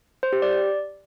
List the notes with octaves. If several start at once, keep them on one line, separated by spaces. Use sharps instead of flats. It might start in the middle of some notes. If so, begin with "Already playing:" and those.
C5
G4
D5